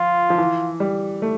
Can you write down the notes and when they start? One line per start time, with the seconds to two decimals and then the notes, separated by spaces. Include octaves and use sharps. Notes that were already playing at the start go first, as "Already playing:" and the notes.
Already playing: F3 F4
0.30 F3
0.38 E3
0.80 G3
1.22 A3